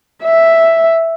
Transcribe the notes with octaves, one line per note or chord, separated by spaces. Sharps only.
E5